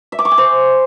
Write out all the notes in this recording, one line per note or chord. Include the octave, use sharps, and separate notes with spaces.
E5
D6
C#6
G#5
C5